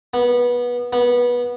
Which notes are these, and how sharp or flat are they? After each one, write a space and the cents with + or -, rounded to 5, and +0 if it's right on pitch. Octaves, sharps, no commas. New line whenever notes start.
B3 -20
B3 -20